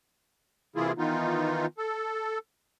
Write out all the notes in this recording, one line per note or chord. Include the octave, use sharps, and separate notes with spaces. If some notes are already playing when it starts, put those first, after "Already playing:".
C3 E3 A#3 E4 F4 G#4
D#3 E3 B3 D#4 F4
A4